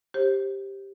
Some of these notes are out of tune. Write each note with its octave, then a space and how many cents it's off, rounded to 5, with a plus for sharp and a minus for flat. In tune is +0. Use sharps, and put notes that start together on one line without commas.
G4 +0 C5 +30